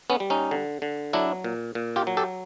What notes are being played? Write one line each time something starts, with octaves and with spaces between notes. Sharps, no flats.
B3 C#4
G3
C#4 D#4
D3
D3
F#3 D4 E4
A#2
A#2
F4 G4
F#3
G4 A4